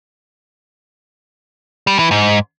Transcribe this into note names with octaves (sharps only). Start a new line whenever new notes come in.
G3
E3
G#2